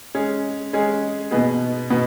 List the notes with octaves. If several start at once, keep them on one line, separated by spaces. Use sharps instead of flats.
G#3 C#4 G#4
G#3 C#4 G#4
B2 B3 D#4 G#4
B2 B3 D#4